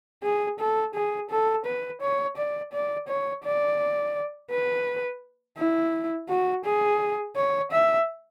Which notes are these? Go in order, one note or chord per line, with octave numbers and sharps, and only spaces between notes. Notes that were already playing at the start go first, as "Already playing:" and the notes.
G#4
A4
G#4
A4
B4
C#5
D5
D5
C#5
D5
B4
E4
F#4
G#4
C#5
E5